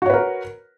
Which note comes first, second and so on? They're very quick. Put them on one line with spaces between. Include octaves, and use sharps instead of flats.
F#4 C#5 B4 A#4